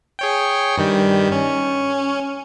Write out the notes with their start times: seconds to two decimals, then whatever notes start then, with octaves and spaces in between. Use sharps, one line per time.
0.19 G#4 C#5 G5
0.78 G2 D#3 G3
1.32 C#4